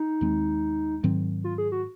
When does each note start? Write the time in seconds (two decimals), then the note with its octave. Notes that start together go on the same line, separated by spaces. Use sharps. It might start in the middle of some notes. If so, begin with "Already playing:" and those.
Already playing: D#4
0.21 D#2 D#3 G#3 C4
1.04 G#2 D#3 F#3 C4
1.44 F4
1.58 G#4
1.72 F#4